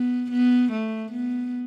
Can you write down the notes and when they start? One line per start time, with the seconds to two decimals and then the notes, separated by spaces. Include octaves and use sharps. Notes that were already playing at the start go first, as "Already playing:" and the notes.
Already playing: B3
0.31 B3
0.72 A3
1.12 B3